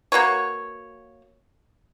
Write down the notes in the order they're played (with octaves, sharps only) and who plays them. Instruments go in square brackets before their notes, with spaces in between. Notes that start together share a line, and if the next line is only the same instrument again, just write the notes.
[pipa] A#3 F#4 B4 C#5